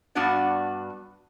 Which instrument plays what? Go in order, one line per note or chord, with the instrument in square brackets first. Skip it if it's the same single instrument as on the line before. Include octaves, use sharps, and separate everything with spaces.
[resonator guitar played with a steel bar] G2 B3 D4 F#4 D5